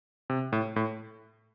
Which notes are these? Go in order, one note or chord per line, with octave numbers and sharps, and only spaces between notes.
C3
A2
A2